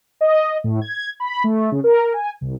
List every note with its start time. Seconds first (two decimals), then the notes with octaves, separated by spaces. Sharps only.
0.21 D#5
0.64 A2
0.82 G#6
1.20 B5
1.44 A3
1.72 C#3
1.84 A#4
2.14 G#5
2.41 C2